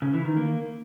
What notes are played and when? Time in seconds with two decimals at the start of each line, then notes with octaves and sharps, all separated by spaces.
0.02 C#3
0.14 E3
0.25 D#3
0.37 A#3